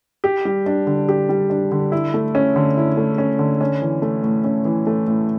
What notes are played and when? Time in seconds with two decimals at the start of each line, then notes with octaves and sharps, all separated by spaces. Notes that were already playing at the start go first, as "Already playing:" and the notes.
0.24 G4
0.45 G3
0.66 D4
0.87 D3
1.09 G4
1.29 G3
1.50 D4
1.72 D3
1.92 E4
2.14 A3
2.35 C#4
2.56 D3
2.77 E4
2.97 A3
3.18 C#4
3.39 D3
3.61 C#4
3.82 E3
4.02 A3
4.23 A2
4.44 C#4
4.65 E3
4.87 A3
5.08 A2